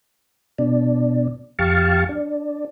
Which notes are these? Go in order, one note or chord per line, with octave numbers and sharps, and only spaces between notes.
B2 D4
F2 G4 F5 A5 C#6
D4